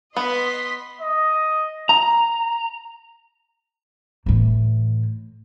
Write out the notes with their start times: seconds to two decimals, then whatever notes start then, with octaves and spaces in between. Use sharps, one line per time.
0.16 B3 D#5 C6 B6
1.01 D#5
1.89 A#5
4.26 A2 E3